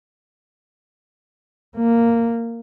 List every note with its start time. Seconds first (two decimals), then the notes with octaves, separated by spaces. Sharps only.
1.77 A#3